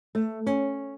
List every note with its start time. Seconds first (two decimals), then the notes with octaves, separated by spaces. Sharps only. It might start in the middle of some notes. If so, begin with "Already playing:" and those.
0.15 A3
0.47 C#4